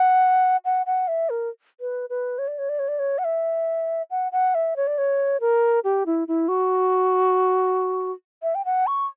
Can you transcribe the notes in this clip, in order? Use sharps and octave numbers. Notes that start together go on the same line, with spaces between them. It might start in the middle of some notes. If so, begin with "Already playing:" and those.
Already playing: F#5
F#5
F#5
E5
A#4
B4
B4
C#5
D5
C#5
D5
C#5
D5
C#5
F#5
E5
F#5
F#5
E5
C#5
D5
C#5
A#4
G4
E4
E4
F#4
E5
G5
F#5
C#6